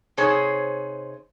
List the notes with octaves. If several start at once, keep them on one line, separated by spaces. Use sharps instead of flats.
C3 D#4 G#4 C5 C#5